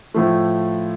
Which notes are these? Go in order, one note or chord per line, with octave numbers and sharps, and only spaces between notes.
A2 F3 A3